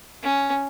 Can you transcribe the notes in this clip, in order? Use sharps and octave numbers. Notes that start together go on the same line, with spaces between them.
C#4